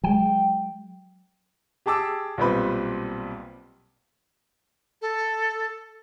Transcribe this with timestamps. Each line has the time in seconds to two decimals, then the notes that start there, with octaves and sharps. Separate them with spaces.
0.04 F#3 G#3 G5
1.86 G4 G#4 A5 D6 E6
2.38 B1 A#2 G3 C4 B4 B5
5.02 A4